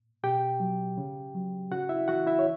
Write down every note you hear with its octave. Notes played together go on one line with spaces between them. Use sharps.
B2 G4 G5
F#3
C#3
F#3
C#3 F#4 F#5
E4 E5
E3 F#4 F#5
E4 E5
C#5